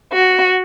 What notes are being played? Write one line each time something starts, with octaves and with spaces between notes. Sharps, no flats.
F#4